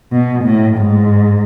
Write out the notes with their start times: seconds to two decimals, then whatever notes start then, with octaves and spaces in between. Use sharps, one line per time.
0.12 B2
0.44 A2
0.78 G#2